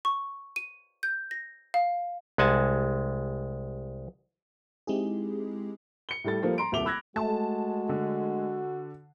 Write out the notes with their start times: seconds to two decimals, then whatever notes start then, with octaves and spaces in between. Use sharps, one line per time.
0.05 C#6
0.56 D#7
1.03 G6
1.31 A#6
1.74 F5
2.38 C2 G#3 F#5 G#5 A5
4.87 G#3 C4 D#4 E4 G4 G#4
6.09 C#7 G7
6.24 A2 G3 A4 A6
6.42 F3 G3 A#3 A4 C5
6.58 A#5 C6 D7
6.72 D#1 C2 E5 D6 F7 G7
6.85 B5 E6 F#6 G#6 A#6
7.16 G#3 A3 F#4 A5
7.89 D3